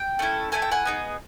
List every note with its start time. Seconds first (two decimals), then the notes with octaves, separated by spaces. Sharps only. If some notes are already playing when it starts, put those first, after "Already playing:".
Already playing: G5
0.19 A3 C#4 E4 A4
0.52 A3 C#4 E4 A4 G#5
0.62 G5
0.72 F#5 G#5
0.85 B3 D#4 G#4